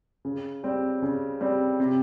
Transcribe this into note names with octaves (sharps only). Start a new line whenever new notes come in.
C#3
G3 C4
C#3
G3 C4
C3